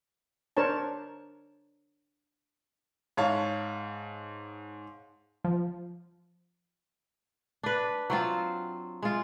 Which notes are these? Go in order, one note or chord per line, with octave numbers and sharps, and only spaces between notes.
D4 A#4 C5 C#5 A5
G#2 C#5 F5 A5
F3
D4 B4
F#3 C4 F4
G#3 F4